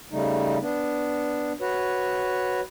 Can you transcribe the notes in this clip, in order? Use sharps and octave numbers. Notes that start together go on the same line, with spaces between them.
C#3 G3 A3 D#4
B3 D4
F#4 B4 C#5